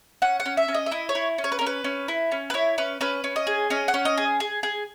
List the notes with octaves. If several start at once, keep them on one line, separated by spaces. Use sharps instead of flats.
C#4 F#5
F#5
C#4
E5
C#4
D#5
E5
E4 D#5
C#5
E4
C#4
C#5
B4
C#4 A#4
B4
C#4
E4
C#4
B4
E4 C#5
C#4 B4
C#4 B4
C#4
D#5
G#4
C#4 D#5
F#5
C#4
D#5
G#4
G#4
G#4